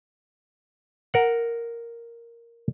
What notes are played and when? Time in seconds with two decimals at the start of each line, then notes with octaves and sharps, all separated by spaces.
1.14 A#4 F#5